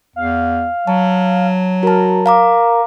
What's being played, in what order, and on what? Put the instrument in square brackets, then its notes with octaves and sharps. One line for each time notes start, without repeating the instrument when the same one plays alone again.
[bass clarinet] E2 [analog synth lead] F5
[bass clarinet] F#3 [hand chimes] A5
[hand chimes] F#4 A5 [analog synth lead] A#4
[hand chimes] F5 A#5 D6